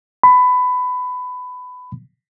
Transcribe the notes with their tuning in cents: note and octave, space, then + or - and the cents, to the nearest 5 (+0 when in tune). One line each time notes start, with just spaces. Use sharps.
B5 +20